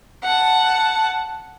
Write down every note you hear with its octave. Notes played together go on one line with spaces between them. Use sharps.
F#5 A5